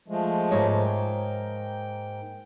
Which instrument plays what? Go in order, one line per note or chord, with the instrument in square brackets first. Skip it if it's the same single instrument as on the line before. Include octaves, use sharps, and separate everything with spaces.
[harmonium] F3 G#3 A3
[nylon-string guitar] G#2 A#3 C#5
[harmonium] G5